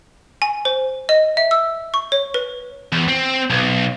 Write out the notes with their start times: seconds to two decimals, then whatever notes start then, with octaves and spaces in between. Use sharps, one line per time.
0.42 G#5
0.65 C5
1.09 D#5
1.37 E5
1.51 E6
1.94 C#6
2.12 C#5
2.34 B4
2.92 E2
3.08 C4
3.50 B1